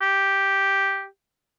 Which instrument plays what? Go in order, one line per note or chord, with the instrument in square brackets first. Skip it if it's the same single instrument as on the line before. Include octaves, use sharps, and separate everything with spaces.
[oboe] G4